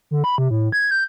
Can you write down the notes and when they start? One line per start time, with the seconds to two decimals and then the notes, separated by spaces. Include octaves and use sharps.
0.11 D3
0.24 B5
0.38 C3
0.51 A2
0.72 G#6
0.91 G6